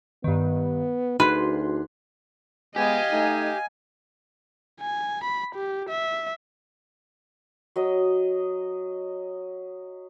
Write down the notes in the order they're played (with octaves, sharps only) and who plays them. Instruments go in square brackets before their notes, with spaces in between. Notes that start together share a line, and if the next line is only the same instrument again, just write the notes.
[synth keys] G2 D#3 [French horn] B3
[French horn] D2 [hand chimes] D#4 F#4 G#4 [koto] B4 [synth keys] C6 F#6
[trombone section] G#3 B3 [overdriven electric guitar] G4 [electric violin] D#5 F5 [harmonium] G#5
[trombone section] A3 D#4
[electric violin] G#5
B5
G4
E5
[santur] F#3 D#5